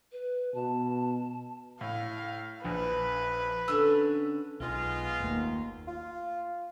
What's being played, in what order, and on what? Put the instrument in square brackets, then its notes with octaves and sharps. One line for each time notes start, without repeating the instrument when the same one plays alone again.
[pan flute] B4
[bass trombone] B2 [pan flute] A5
[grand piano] A2 [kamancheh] F5
[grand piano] A#1 [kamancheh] B4
[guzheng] D3 C#4 [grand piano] E6
[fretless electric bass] B1 [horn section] G#3 B3 F4
[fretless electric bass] F#1 A3 [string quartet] D#2
[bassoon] F4